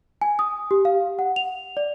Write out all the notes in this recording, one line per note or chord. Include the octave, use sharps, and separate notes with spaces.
G#5
D#6
G4
F5
F#5
F7
D5